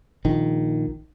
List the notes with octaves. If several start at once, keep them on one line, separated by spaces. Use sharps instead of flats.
A#1 D#3